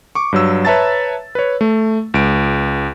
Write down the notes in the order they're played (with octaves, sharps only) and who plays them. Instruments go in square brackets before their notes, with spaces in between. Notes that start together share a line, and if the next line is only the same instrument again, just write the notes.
[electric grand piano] C#6 D6
G2 F#3 E6
B4 C#5 E5 A5 A#5 A6
B4 C#5
A3
C#2 D7